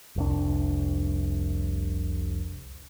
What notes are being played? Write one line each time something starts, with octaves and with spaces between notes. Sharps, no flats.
F1 C2 D4